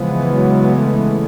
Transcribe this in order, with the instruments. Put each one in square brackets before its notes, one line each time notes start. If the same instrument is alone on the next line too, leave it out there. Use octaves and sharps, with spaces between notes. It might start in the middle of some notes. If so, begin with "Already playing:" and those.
Already playing: [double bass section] C#3 E3 G#3 B3 [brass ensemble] F3
[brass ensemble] F#3
A3